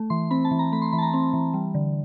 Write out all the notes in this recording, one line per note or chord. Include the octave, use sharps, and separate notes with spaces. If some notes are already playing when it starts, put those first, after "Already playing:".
Already playing: A3
E3 C6
C4 B5
A5
E3
A#5
A3 B5
C6
E3 B5
A5
A#5
C4
E3
G3
D3